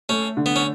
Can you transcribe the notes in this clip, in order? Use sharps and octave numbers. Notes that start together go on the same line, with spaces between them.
A3 C#4
D3
B3
C#4